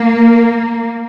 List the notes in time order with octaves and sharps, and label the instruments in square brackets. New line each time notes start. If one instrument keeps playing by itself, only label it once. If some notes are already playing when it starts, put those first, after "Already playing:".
Already playing: [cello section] A#3